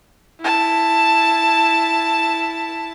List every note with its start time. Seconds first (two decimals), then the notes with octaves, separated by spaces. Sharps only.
0.40 E4 A5